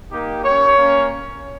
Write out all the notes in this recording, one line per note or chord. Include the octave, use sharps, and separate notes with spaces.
A#3 D#4 G4
A#3 C#4 G4 C#5
A#3 C#4